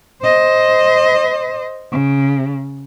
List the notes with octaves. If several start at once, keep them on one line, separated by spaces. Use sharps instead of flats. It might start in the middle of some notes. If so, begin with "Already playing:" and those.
C5 D#5
C#3